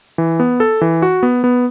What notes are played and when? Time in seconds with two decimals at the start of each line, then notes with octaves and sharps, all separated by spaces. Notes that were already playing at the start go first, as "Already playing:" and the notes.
0.18 E3
0.40 B3
0.60 A4
0.81 E3
1.02 F#4
1.23 B3
1.44 B3